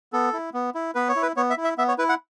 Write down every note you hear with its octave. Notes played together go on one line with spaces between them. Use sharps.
B3 A4
E4
B3
E4
B3 B4
C#5
E4
B4
B3 C#5
E5
E4
E5
B3 E5
C#5
E4 B4
F#5